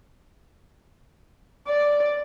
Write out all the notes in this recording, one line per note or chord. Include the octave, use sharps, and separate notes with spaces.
D5